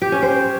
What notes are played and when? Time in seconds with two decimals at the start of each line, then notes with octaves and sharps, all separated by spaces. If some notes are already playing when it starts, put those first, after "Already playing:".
0.02 G4
0.12 C#4
0.22 C5